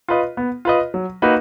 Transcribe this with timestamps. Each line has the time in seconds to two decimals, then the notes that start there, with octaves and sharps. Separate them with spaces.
0.08 F4 B4 D#5
0.37 B3
0.65 F4 B4 D#5
0.94 F#3
1.22 A#3 D#4 F#4 B4